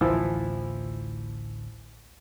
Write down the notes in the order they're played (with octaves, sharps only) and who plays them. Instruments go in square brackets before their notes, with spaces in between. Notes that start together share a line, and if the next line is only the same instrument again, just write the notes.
[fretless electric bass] A1 D2 [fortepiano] E3 F3 E4